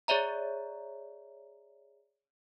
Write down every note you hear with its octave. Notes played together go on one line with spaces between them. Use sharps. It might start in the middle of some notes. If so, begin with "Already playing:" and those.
G#4 C#5 D5 E5 A#5